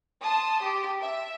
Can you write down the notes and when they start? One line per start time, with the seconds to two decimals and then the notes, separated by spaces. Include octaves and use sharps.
0.23 A5 C6 D#6
0.64 G4
1.01 E5